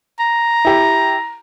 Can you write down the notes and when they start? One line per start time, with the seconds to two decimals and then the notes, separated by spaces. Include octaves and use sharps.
0.19 A#5
0.65 E4 G4